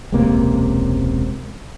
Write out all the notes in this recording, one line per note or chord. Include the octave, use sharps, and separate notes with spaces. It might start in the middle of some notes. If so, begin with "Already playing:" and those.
E1 C#2 C3 A#3